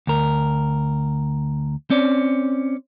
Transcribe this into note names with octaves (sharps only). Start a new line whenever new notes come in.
D2 A#4
C4 C#4 D5